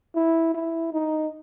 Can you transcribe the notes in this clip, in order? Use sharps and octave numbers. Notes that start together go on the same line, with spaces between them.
E4
E4
D#4